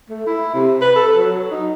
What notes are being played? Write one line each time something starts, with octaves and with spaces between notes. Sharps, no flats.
A3
E4
C3
B4
A4
F#3
D#4